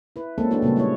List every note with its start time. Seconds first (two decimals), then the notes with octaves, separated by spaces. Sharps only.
0.16 E4 B4
0.38 G#3 A#3 C4 C#4 A4
0.51 E3 A3 B3 D4 E4 F#4
0.62 A#2 C#3 G3 B3
0.76 G3 G#3 E4 C#5